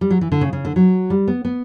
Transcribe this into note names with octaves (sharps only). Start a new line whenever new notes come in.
G3
F#3
E3
D3
C#3
C#3
D3
F#3
G3
B3
B3